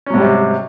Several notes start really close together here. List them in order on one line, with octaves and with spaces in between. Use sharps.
C#4 F#3 G#2 G3 C3